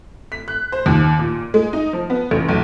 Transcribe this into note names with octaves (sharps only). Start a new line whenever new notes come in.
B6
F#6
C5
D#2
A#2
G#3
D#4
F3
B3
A1
B1